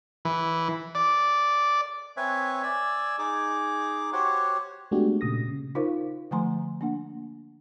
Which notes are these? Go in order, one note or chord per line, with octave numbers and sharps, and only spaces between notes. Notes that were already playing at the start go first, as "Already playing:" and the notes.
E3
D5
C4 B4 C#5 E5 G#5
D5 G#5 E6
D#4 G#4 D6
F#4 G4 C5 C#5 F#5
G#3 A3 B3 D4 F#4 G4
A#2 C#3 D#6 A#6
C#3
D#4 F4 A#4 C5 F5 C#6
D3 F3 A3 G#5 A#5 C6
A#3 D4 F#5